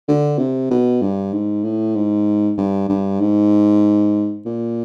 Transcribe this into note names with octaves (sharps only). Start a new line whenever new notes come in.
D3
C3
B2
G2
G#2
A2
G#2
G2
G2
G#2
A#2